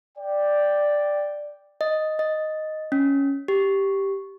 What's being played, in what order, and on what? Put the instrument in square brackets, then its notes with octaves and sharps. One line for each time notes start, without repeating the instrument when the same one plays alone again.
[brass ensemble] D5 G5
[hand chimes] D#5
D#5
C#4
G4